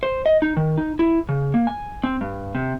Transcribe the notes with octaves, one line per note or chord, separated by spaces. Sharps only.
C5
D#5
D#4
D#3
D#4
E4
C#3
A#3
G#5
C4
G2
C3